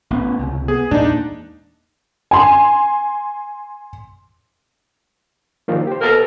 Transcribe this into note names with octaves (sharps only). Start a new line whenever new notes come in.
A1 B3 C#4
C#2 C3
B3 G#4
E2 A#2 G#3 D4 D#4
G#5 C6
D#3 F3 A#3
G4 C5
B2 A4 A#4